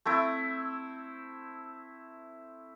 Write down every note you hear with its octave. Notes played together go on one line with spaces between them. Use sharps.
A3 C4 E4